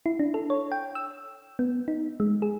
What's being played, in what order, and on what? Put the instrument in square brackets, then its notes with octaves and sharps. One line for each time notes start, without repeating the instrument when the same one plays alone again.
[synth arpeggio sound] E4
D4
A4
C#5
G5
E6
B3
D#4
G#3
G#4